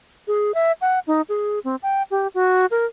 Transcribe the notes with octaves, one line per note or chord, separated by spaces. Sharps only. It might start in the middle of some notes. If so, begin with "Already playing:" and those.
G#4
E5
F#5
D#4
G#4
C4
G5
G4
F#4
A#4